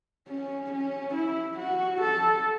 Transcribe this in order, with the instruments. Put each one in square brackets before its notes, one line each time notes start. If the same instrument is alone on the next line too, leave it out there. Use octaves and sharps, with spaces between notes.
[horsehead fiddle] C#4
C#4
E4
F#4
A4